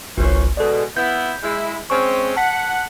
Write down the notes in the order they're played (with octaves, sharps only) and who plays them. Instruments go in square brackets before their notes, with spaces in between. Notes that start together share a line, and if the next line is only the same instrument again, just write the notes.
[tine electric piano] G1 C2 [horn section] E3 C#4 C5
[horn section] B2 G#3 [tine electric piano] A4 D5
[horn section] B3 E4 [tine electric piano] G6
[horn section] G#3 E4
[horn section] G#3 C4 C#4 [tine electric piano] C#6
[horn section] F#5 [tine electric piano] A5 B6